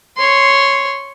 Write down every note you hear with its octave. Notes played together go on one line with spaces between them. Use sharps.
C#5 C6